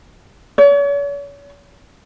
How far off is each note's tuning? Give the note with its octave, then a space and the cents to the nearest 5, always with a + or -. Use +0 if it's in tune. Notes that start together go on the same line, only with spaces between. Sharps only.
C#5 +40